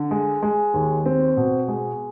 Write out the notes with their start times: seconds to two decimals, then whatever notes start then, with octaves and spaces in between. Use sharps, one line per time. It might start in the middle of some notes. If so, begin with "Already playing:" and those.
Already playing: D3
0.11 G#3
0.43 G#3
0.74 D#2
1.06 C4
1.37 B2
1.68 G#3